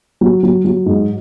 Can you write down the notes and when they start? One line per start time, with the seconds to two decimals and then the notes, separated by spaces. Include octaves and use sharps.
0.21 F#3
0.43 F#3
0.65 F#3
0.86 G#2